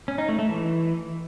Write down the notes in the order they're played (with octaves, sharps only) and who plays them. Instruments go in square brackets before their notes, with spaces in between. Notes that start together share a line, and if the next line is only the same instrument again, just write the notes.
[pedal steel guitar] C#4
D#4
A3
A3
E3